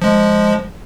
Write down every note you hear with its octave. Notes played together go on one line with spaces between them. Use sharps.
F3 G#3